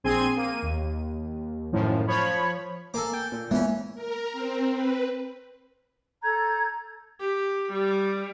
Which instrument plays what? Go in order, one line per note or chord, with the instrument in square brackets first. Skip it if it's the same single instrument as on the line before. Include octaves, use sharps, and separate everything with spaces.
[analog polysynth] A#1 C4 G#4 C6 G#6 D#7
A#3 D#7
D#2
F#2 A2 D#3 F3
F3 C#5 B5
[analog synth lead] A#3 [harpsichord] A4 G#5 D6
[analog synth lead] G5
A#2
[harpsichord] E3 C#4 [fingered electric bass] G#3 A#3 B3
[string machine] A#4
C4
B4
[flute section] A4 A#5 G6 G#6
[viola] G4
G3